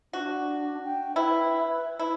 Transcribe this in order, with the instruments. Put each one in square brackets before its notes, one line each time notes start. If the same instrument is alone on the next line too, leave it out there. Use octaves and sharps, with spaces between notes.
[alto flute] D4 [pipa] F#4
[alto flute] G5
[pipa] E4 [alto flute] B4
[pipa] E4